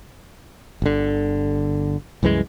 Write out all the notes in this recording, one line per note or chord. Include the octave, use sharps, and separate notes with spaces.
G1 D3
C2 F#2 E3 G#3